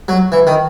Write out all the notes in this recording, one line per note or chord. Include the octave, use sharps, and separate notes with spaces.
F#3
E3
D#3